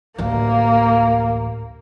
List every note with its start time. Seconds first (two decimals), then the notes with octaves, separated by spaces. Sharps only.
0.18 A1 D2 A#3